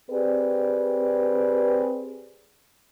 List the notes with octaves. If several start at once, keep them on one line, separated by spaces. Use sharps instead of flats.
C4 G4 G#4 B4 D5